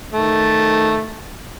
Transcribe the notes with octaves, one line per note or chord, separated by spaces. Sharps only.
D#3 A3